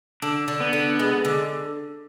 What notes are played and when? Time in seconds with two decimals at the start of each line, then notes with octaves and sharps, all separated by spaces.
0.22 D3 D4
0.48 D3
0.60 B3
0.73 D3
0.99 G#3
1.25 D3